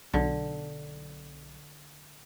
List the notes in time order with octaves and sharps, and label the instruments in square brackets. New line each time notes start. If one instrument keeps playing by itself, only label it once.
[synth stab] B1 [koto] D3